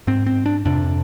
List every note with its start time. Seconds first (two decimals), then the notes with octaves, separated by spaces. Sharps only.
0.07 G#2 C4
0.26 C4
0.46 D4
0.65 F2 C3 D4